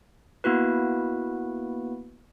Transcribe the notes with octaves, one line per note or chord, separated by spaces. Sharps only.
A#3 B3 E4 F#4 B4